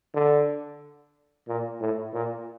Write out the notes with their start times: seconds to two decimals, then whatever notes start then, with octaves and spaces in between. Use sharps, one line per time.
0.14 D3
1.48 A#2
1.81 A2
2.13 A#2